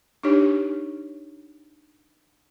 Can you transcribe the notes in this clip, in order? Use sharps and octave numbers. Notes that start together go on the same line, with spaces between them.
D4 D#4 G4 C#5